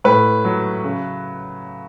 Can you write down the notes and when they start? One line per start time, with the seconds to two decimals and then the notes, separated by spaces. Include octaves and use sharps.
0.04 A2 B4
0.45 F#3
0.84 C#3